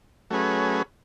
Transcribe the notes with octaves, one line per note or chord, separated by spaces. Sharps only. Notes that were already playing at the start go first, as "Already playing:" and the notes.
F#3 A3 C#4 G#4 B4